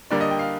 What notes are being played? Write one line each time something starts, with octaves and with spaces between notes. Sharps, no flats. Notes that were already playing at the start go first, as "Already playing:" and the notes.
D3 G3 A#3 D5
D#5
G5
F5